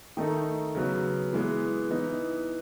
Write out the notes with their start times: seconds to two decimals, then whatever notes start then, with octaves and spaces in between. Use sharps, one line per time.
0.17 D#3 A3 D#4
0.75 C#3 F#3 B3
1.33 E3 G#3 B3
1.90 E3 B3 D#4